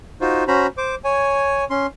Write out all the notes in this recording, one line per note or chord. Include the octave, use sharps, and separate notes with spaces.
D#4 F4 F#4 C5
C#4 F#4 C5 A#5 B5
C5 D6
C#5 G#5
C#4 C6